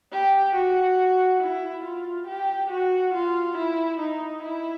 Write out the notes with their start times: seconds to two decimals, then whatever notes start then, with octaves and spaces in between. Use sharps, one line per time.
0.13 G4
0.55 F#4
1.41 E4
1.84 F4
2.27 G4
2.71 F#4
3.14 F4
3.57 E4
4.00 D#4
4.43 E4